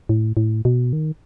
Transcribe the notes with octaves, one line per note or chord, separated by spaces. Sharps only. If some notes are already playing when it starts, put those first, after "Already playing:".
A2
A2
B2
D#3